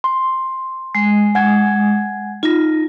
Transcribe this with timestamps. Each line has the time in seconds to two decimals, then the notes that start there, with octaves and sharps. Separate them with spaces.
0.04 C6
0.95 G#3
1.35 F#5 G#5 G#6
2.43 D#4 F4 A#6